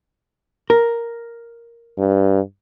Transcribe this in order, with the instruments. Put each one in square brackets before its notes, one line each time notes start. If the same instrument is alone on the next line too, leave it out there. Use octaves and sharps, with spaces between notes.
[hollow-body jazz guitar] A#4
[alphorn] G2